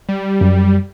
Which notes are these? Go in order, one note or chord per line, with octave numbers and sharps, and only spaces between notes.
G3
F#2